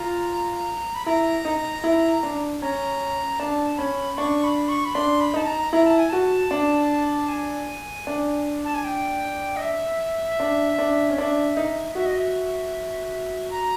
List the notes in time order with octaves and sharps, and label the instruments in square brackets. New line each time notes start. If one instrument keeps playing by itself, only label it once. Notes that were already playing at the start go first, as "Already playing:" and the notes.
Already playing: [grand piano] F4 [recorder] A#5
[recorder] B5
[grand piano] E4 [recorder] A#5
[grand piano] D#4
E4
D4
[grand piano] C#4 [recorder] A#5
[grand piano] D4 [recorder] A5
[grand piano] C#4 [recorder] B5
[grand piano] D4 [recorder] C#6
[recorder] B5
C#6
B5
[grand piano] D4 [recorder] C6
[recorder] B5
[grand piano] D#4 [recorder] A5
[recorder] A#5
[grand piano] E4 [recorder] A#5
[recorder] A5
G#5
[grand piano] F#4 [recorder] A5
[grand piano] D4
[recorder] G#5
[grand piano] D4
[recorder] A5
G#5
G5
D#5
E5
[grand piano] D4
D4
C#4
[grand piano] D4 [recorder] E5
[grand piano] D#4
[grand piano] F#4 [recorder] E5
[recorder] D#5
E5
A#5